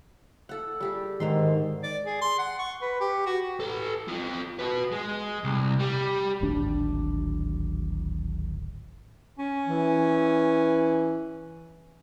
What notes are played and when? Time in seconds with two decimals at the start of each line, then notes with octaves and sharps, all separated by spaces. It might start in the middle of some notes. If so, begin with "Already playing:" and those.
0.49 A4 F#5
0.81 G3 G4 G#4
1.20 G#2 D3 D#3 D#4 C6
1.83 D5
2.05 G#4
2.22 C6
2.39 F#5
2.59 C#6
2.82 B4
3.01 G4
3.26 F#4
3.60 A4 B4
4.08 F4 A4
4.59 F#4 B4
4.92 G#3
5.44 C2
5.79 G3
6.41 D1 G#1 C4 D4
9.39 C#4
9.66 E3